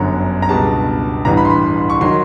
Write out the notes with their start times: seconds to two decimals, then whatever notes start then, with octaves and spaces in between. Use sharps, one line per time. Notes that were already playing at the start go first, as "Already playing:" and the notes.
Already playing: G1 F#2 D3 A#5
0.42 A#5
0.49 C#2 B2 G3 B3 A5
1.25 A1 G2 E3 A#5
1.37 B5
1.45 C6
1.50 B5
1.90 C#6
2.01 D#3 F#3 C6